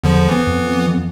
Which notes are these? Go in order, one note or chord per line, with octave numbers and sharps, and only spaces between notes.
E2 D3 F3
E3 B3
F2